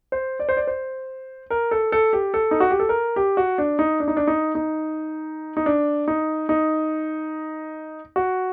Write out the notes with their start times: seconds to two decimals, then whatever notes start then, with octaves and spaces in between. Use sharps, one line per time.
0.12 C5
0.40 D5
0.49 C5
0.57 D5
0.67 C5
1.50 A#4
1.71 A4
1.92 A4
2.13 G4
2.34 A4
2.51 D#4
2.60 F#4
2.71 G4
2.79 A4
2.89 A#4
3.16 G4
3.37 F#4
3.58 D4
3.79 D#4
4.00 D4
4.08 D#4
4.17 D4
4.27 D#4
4.55 D#4
5.57 D#4
5.66 D4
6.08 D#4
6.49 D#4
8.16 F#4